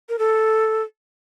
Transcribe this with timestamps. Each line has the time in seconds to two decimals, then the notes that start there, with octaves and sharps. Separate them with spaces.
0.09 A#4
0.19 A4